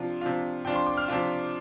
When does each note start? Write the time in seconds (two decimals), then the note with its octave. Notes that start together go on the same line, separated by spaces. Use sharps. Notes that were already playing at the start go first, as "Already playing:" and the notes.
Already playing: C3 F3 D4 F4
0.21 C3 F3 D4 F4
0.65 C3 F3 D4 F4 G5
0.76 C6
0.86 D6
0.97 F6
1.08 C3 F3 D4 F4